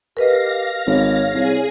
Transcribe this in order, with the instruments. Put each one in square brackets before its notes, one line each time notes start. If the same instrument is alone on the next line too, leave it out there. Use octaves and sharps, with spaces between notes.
[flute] G4 [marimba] A#4 B4 D#5 [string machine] F5 A#6
[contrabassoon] G#1 [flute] C#5
[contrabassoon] C2 [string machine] G#4